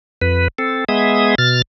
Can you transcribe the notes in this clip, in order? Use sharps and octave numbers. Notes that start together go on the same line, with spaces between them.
F2 B4
C4 A4
G#3 B3 G#4 E5 D#6
B2 F6 A6